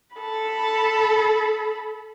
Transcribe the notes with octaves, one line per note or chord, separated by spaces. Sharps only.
A4 B5